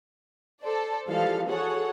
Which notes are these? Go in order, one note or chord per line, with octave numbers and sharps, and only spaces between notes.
A4 C5 D5
E3 F3 G3 G#3 A4 F5
F#4 G#4 A4 C#5 F#5